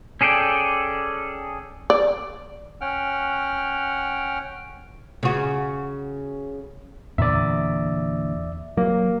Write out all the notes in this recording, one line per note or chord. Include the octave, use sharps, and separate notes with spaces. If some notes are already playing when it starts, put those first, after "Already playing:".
C#4 G#4 A4 D5 G5
D5
C#4 F#5 G5 F6
C#3 F#4
E2 A#2 D3 D5 E5
F#3 A#3